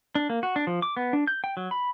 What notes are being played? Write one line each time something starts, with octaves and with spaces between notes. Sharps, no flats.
D4
A#3
F#4
D4
F3
D6
B3
D4
G6
G5
F#3
B5